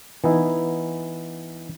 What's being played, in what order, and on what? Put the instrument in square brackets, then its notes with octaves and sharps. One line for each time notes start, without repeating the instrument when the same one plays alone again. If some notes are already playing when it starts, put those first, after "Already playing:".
[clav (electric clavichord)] E3 B3 D#4 E4